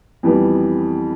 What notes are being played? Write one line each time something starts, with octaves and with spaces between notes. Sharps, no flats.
F2 E3 G3 B3